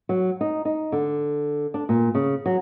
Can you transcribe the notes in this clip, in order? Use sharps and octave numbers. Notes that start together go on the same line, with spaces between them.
F#3
D#4
D#4
D3
D4
A#2
C#3
F#3